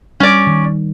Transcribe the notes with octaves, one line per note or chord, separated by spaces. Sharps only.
G3 C#4 D5
D#3